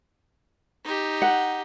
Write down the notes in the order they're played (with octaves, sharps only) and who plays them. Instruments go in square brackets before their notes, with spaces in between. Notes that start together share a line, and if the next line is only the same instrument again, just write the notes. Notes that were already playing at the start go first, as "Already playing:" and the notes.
[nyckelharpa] D#4 G4
[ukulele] F#5